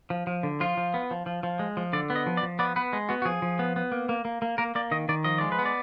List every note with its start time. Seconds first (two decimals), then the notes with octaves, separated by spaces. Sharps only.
0.10 F3
0.27 F3
0.43 D3
0.60 F3 F4
0.77 F3
0.94 B3
1.11 F3
1.26 F3
1.43 F3
1.59 G#3
1.77 F3
1.93 D3 D5
2.10 B3
2.16 D#5
2.27 F3
2.37 D5
2.43 F3
2.59 B3 D5
2.76 B3 B4
2.93 G#3
3.09 B3 F#4
3.22 F#4
3.25 F3 G#4
3.42 F3
3.59 B3
3.76 B3
3.92 A#3
4.09 A#3
4.25 A#3
4.42 A#3
4.58 A#3 A#4
4.75 A#3 D5
4.91 D#3 D#5
5.09 D#3 D5
5.24 F3 D#5
5.38 G#3 D5
5.52 B4
5.59 B3
5.65 D5